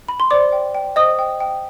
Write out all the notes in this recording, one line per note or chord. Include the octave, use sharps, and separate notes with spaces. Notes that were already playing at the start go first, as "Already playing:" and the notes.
B5
C6
C5 D5 D6
G5
G5
C5 D#5 D#6
G5
G5